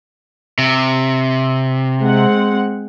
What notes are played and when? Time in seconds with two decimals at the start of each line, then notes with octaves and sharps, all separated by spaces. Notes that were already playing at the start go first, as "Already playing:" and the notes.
0.58 C3
2.00 G#3 C4 F#5